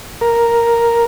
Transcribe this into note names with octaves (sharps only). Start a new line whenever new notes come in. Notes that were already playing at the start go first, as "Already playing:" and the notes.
A#4